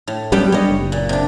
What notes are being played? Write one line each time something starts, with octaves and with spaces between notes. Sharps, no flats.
A2
F#3 G3 B3 C#4 G4
G3 A3 D4 C#5 D#5
F#1
A#2
C3 D4